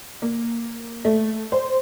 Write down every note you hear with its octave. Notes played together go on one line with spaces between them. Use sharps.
A#3
A3
C5